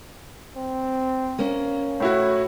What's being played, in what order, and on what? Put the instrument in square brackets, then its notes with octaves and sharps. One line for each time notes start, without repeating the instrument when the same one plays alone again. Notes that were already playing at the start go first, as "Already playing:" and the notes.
[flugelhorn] C4
[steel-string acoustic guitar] A#3 C#4
[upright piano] A2 E4 F#4 [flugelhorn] C#5